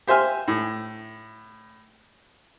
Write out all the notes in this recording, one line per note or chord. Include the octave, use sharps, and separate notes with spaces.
G4 C5 E5 G#5 F6
A2